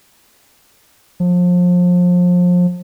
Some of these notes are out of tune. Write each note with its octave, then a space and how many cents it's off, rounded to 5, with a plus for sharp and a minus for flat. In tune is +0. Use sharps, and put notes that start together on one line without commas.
F3 +30